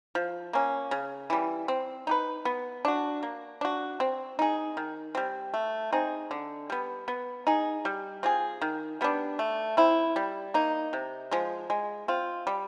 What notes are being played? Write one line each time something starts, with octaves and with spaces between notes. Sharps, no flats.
F3
A#3 C#4
C#3
E3 G3
C4
D#4 G4 B4
B3
D4 F#4
A#3
D4 F#4
C4
D#4 G#4
D#3
G3 C4
A3
C4 D#4 G#4
D3
G3 B3
B3
D#4 G#4
G3
C4 F4 G#4
D#3
G3 B3 D4
A3
C4 E4
G3
A#3 D#4
C3
F3 G#3
G#3
C4 F4
G3